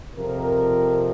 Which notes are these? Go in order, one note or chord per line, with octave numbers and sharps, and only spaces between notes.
F2 C3 F3 A#4